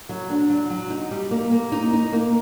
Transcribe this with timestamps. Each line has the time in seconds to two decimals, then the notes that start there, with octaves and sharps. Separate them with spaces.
0.09 F#3
0.30 D4
0.50 F#3
0.70 F#3
0.90 D#4
1.11 G3
1.31 A#3
1.51 A#3
1.72 D#4
1.93 D#4
2.13 A#3